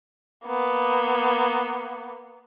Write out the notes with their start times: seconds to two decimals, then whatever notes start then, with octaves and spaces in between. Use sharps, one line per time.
0.45 A#3 B3